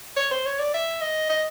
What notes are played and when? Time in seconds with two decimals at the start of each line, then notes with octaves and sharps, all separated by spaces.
0.17 C#5
0.31 C5
0.46 C#5
0.60 D5
0.74 E5
1.01 D#5
1.29 D#5